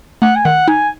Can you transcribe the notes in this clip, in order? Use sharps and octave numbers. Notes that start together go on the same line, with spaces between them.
A3 F#5
G#5
D#3 F#5
D#4 G#5